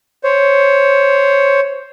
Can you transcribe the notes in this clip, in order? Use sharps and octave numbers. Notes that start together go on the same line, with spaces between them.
C5 C#5